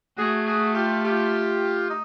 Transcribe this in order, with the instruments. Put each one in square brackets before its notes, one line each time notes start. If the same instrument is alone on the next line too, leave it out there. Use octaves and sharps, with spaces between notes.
[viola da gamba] A3 [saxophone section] F#4 G#4
[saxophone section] F#4 G#4
F4 G4
F4 G4
D#4